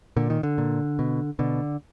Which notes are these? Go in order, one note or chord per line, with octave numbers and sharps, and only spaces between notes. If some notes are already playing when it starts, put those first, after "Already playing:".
A#2 D3
D#3
D3
A#2
B2
B2 D3